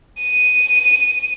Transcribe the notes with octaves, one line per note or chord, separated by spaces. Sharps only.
D#7